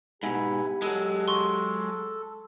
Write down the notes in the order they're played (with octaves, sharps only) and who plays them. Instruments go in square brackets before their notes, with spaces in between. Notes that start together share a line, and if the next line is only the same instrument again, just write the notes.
[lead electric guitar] G#2 B2 [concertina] E4 G#5 B5 [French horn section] G4
[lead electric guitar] F#3 G#3 [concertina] A4
[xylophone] C6 C#6